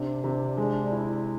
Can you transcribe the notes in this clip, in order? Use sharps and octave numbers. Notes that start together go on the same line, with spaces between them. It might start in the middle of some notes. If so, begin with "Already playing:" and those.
Already playing: C3 D4
C3
G#3
E4